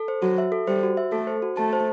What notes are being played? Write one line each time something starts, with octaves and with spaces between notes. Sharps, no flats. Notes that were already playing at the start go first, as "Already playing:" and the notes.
Already playing: A4
C5
F#3 F#4
E5
A4
G3 C5
F#4
E5
A3 A4
C5
F#4
A3 A5
C5